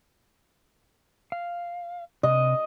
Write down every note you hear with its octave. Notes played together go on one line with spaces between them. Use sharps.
F5
C3 D#5